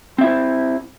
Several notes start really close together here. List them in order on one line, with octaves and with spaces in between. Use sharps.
C4 E5 E4 C5